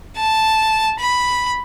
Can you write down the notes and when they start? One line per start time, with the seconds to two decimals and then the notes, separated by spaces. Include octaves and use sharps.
0.17 A5
0.99 B5